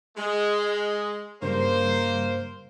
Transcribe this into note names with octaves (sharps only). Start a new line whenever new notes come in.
G#3
G2 C#3 G3 A#3 C5